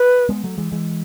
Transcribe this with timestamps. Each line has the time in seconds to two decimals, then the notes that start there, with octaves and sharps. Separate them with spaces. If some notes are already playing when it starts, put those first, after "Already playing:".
Already playing: B4
0.29 G#3 B3
0.44 F#3 A3
0.58 E3 G#3
0.72 E3 G#3